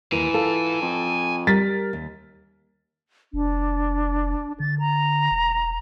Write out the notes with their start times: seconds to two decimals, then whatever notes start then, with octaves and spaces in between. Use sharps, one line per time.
0.12 D#2 E3 A#4 G#5 A#5
0.34 F4 A4
0.82 F2
1.47 G3 A#4 A6 B6
1.93 D#2
3.33 F1 D4
4.60 D3 A6
4.79 A#5
5.31 E1